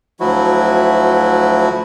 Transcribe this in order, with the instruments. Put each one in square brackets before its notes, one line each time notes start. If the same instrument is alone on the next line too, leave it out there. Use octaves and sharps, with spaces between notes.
[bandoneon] D2 F3 F#3 E4 F#4